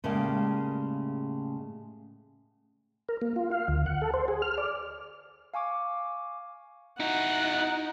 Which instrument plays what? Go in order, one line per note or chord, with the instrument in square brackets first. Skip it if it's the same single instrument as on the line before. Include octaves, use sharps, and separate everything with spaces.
[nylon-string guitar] A2 C#3 G3 G#3 A#3
[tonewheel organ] A#4
A#3
F4
F5
D2
F#5
A4
C5
G#4
F6
D5
[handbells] F5 G#5 C#6 D6
[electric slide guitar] D#4 [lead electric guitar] E4 F#4 [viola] F#5